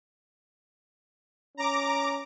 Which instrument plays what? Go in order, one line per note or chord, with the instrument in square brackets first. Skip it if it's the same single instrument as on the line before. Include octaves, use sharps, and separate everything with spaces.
[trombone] C#4 [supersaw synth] A#5 D6